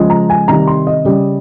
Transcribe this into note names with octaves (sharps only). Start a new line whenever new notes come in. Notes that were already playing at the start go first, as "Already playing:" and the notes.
Already playing: C#3 F3 G#3
A#5
G#5
C3 D#3 G3 A#5
C6
D#5
C#3 G3